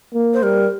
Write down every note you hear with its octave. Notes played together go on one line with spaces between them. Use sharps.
A#3
C5
G3 A#4